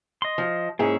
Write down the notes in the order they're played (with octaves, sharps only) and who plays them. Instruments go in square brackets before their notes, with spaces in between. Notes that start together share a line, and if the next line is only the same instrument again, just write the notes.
[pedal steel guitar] D#5 C6
[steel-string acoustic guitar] F3
[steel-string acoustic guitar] G#2 E4 G#4 [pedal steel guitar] A#3 C#4